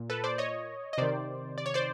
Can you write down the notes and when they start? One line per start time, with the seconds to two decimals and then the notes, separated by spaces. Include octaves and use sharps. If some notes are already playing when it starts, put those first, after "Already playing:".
Already playing: A#2
0.10 A4 B4
0.24 C5 D5
0.38 C#5 D#5
0.93 D#5
0.98 C3 D#3 C5 D5
1.58 D5
1.66 C#5
1.74 C5 D5